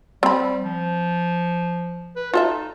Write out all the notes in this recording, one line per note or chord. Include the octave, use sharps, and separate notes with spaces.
G3 C4 B5
F3
B4
D#4 F4 A4 E5